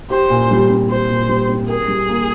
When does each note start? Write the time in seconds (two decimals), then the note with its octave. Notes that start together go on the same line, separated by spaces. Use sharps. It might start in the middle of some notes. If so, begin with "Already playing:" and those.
0.10 G4 C5
0.30 A#2
0.51 G3
0.69 C4
0.89 G4 C5
1.10 A#2
1.29 G3
1.49 C4
1.68 G#4 A#4
1.88 G3
2.09 A#3